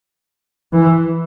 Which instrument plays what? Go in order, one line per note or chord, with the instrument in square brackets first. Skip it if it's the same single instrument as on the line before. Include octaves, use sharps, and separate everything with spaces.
[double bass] E3